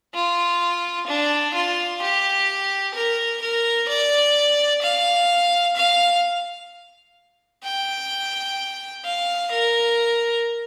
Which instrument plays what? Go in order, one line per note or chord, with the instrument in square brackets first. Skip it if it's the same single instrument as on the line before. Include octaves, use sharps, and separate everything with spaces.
[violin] F4
D4
F4
G4
A#4
A#4
D5
F5
F5
G5
F5
A#4